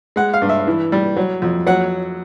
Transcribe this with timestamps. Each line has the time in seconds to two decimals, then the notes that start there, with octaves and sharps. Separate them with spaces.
0.16 G#3 F#5
0.34 F5
0.42 G2
0.49 E5
0.67 E3
0.92 G3
1.16 F#3
1.42 F2
1.66 F#3 F#5